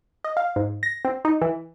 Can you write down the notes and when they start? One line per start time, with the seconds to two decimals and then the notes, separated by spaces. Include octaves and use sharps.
0.24 D#5
0.37 F5
0.56 G#2
0.83 A#6
1.05 C4
1.25 D#4
1.41 E3